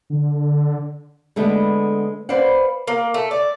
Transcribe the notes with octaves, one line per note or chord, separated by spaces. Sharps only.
D3
D3 G#3 A3 B3
B4 C5 D5 F5 F#5
A#3
A3
D5